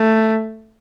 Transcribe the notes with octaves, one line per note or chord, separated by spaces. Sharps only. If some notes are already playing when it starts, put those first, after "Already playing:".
Already playing: A3